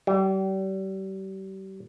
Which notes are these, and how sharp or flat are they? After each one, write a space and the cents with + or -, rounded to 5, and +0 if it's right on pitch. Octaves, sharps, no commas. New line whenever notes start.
G3 -35